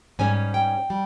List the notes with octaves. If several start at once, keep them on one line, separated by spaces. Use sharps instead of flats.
G#2 G3 C#4 G#5
G5
G3